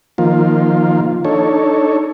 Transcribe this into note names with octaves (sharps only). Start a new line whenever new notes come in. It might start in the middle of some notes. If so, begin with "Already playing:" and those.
D#3 F3 A#3 F4
D4 D#4 A4 C#5